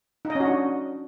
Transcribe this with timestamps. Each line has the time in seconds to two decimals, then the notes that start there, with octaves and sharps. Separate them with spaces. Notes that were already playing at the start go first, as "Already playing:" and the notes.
0.25 D#4
0.30 D#5
0.35 C#4
0.40 F#4
0.46 D4